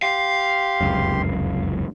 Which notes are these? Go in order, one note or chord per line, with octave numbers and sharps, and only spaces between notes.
G4 F5 C6
F1 C#2 F#2